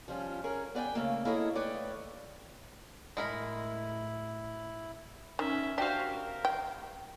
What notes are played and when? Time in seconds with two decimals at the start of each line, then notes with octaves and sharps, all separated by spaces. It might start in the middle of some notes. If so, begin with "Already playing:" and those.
0.08 F3 G3 C#4 F4
0.44 C#4 G#4 A#4
0.75 B3 D5 D#5 G5 G#5
0.95 C#3 A3 A#3
1.25 A#3 E4 G#4 A4 C#5 D#5
1.55 A3 B4 C#5 D5 G5
3.17 A2 G#3 E4 A#4 B5
5.39 D#3 C#4 E5
5.78 D4 F#4 G4 C5 F5
6.08 A#4
6.45 G5